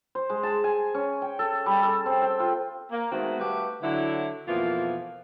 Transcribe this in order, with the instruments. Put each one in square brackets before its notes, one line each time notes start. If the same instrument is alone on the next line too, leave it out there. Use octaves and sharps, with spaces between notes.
[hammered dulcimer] C5
G#3
A5
G#5
C#4
G5
A4
G3
A4
C4
G5
F4
[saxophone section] A#3
D#3 G#3 A3 B3 C4 F#4
G3 A3 F#4 G4 B4 F5
D3 F#3 E4
F2 B2 E3 F3 A#3 F4